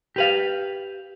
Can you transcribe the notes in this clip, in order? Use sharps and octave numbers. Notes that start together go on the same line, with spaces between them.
G4 B4 F5